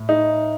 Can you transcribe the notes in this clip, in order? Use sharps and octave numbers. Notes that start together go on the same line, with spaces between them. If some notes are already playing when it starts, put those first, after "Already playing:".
Already playing: A2
D#4